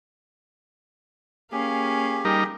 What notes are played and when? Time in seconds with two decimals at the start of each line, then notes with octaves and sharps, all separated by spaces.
1.52 A#3 C#4 G4 G#4 F5
2.25 G3 D#4 A#4